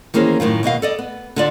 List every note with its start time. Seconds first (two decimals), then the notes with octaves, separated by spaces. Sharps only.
0.14 D#3 E3 A#3 C#4 G#4 C5
0.40 F#2 A2 D#3 F4
0.63 D#2 B2 D#5 F5
0.82 A4 D5 D#5
0.99 B3
1.36 D3 F4 D5